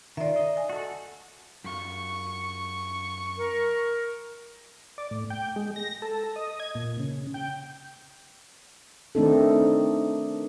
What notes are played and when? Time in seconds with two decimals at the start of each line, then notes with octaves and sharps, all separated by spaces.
0.17 D#3 F4 D5 E5
0.36 D#5
0.57 G#5
0.69 F#4 A4
1.64 F#2 F4 C#6
3.37 A#4
4.98 D5
5.11 A2
5.30 G5
5.56 G#3
5.76 A#6
6.02 A4
6.36 D#5
6.60 G#6
6.75 A#2
7.00 C#3
7.34 G5
9.15 D#3 A3 C4 D4 D#4 A4